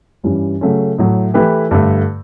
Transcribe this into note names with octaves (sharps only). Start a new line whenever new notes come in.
G2 E3 G3 C#4
C#3 F#3 A3 C#4
A2 F#3 A3
E3 A3 E4 G4 B4
G2 D3 A3